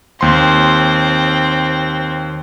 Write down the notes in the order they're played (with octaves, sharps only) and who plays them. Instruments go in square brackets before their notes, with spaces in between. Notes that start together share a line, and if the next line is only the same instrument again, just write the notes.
[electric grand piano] D#2 C6 [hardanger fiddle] C4